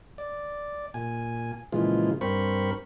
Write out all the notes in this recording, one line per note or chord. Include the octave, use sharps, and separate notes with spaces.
D5
A#2 G#5
A#2 C#3 E3 F3 G#3 F4
G2 C4 A#4 C5 B5 C#6